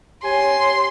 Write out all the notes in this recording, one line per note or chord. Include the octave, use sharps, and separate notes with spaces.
G4 C#5 G#5 C6